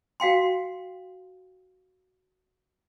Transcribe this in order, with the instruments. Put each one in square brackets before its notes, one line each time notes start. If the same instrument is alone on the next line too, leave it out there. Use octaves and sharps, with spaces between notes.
[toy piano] F#4 F5 G5 C6